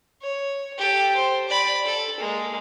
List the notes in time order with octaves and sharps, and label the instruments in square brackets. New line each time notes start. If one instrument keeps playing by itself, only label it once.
[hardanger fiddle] C#5
G4 A4
C5
D5 B5
A4
G#3 A#3